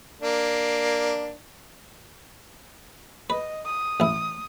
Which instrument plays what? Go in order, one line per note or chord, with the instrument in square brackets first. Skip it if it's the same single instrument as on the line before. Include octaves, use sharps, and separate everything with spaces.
[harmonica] A#3 D4
[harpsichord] B4 [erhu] D#5
[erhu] D#6
[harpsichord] A1 E4